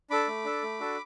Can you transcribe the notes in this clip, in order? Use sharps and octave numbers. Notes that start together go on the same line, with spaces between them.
D4 A4 B5 D6
A3
D4 A4
A3
D4 F#4 A4